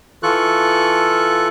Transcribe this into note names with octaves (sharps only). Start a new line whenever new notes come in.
E3 F4 A4 C#6 F#6